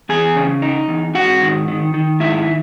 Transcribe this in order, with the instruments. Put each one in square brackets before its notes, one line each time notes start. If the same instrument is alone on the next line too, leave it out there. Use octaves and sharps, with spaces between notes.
[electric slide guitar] E2 G#4 G#5
C#3
D#4
E2
G#2 F#4 F#5
D#3
D#3
D#3
G#2 E4 E5